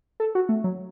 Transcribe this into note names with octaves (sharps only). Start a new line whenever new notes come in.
A4
F#4
A3
F#3